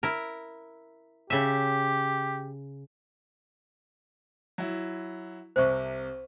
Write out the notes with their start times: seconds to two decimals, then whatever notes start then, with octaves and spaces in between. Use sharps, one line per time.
0.03 E4 A#4
1.30 C#3 G4 E5
4.58 F#3 E4
5.56 C2 C3 C5 C#6